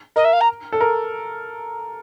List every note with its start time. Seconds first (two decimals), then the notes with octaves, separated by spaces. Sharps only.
0.16 A#4 D#5
0.24 E5
0.32 F5
0.40 A#5
0.73 A4
0.81 A#4